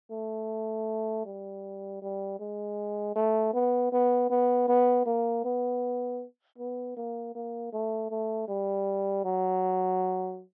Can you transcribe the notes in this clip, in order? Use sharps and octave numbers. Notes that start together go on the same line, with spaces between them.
A3
G3
G3
G#3
A3
B3
B3
B3
B3
A#3
B3
B3
A#3
A#3
A3
A3
G3
F#3